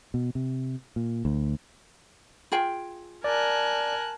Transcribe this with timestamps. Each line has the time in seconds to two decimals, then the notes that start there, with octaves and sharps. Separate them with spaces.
0.14 B2
0.35 C3
0.96 A#2
1.25 D2
2.52 F4 G#4 G5
3.24 A#4 D5 G#5 A5 F#6